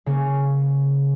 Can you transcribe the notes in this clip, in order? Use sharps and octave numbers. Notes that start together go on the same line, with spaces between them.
C#3 A#3 C#4